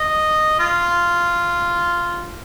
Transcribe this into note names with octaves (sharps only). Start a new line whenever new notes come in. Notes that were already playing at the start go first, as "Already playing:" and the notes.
Already playing: D#5
F4